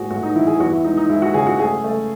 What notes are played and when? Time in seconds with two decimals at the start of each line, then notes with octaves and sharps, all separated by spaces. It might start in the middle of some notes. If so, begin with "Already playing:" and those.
Already playing: A2 G#3 F#4 G#4
0.10 A2 F#4
0.23 D#4
0.35 E3 E4
0.47 G#4
0.60 E2 F#4
0.73 E4
0.84 G#3 D#4
0.97 D#4
1.09 G#3 E4
1.22 F#4
1.34 C#3 G#4
1.47 F#4
1.59 A3 G#4
1.84 A3